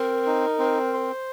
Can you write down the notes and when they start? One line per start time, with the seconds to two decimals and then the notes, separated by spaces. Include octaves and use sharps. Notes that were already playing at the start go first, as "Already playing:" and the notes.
Already playing: C4 A#4
0.26 D#4
0.59 C4
0.93 C5